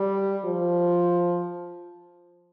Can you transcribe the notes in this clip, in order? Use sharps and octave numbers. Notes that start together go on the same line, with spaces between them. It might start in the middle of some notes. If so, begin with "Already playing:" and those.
Already playing: G3
F3